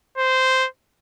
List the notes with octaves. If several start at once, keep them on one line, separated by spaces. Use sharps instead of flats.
C5